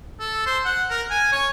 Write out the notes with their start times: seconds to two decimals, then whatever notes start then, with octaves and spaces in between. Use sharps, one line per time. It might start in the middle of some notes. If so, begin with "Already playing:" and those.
0.20 A4
0.46 C5
0.65 F#5
0.90 A#4
1.10 G#5
1.32 C#5